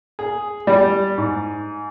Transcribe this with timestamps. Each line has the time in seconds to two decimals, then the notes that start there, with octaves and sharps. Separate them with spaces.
0.19 G#4
0.67 G3
1.18 G#2